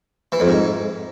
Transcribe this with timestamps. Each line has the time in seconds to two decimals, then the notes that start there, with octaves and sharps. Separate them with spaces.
0.32 E3
0.40 F2
0.48 G#2